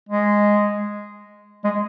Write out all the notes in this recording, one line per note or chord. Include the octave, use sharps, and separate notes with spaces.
G#3
G#3